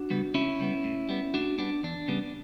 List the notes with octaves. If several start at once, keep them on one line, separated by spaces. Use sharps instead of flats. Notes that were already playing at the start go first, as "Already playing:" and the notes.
Already playing: D4 F#4
C#3 G3 B3
C#2 C#4 E4
C#3 G3 B3
A2
G3 B3
A2 D4 F#4
G3 B3 D4
E2 D4
C#3 G3 B3